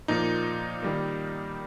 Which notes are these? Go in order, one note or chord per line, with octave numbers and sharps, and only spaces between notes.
A#2 F3 A#3 D#4
D#3 G3 A#3